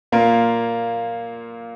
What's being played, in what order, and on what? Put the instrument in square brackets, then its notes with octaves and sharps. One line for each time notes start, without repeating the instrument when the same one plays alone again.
[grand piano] A#2 A#3 F4